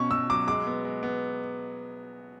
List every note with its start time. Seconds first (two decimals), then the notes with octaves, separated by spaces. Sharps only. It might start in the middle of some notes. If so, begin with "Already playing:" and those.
Already playing: B2 C#4 C#6
0.11 B2 E6
0.29 F#3 D6
0.47 G#3 D6
0.67 B3
0.85 G#3
1.03 B3